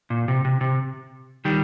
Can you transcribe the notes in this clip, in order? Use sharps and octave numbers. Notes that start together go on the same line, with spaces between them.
A#2
C3
C3
C3
D#3 G3